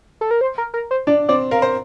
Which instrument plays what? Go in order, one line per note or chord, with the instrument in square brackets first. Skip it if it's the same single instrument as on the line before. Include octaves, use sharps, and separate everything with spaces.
[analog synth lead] A4
A#4
C5
A#4
A#4
C5
[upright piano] D4 [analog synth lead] D5
[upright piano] C4 [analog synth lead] D5
[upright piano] A#4 [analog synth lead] F5
[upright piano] C5